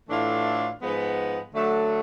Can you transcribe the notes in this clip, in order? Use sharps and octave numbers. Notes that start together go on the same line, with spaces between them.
A2 E3 A3 D4 F4
G#2 F3 G#3 B3
D3 F#3 A3